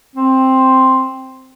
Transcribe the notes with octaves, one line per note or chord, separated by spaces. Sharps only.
C4